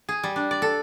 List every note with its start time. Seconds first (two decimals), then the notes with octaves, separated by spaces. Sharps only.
0.09 G#4
0.23 G3
0.36 D4
0.51 D5
0.62 A4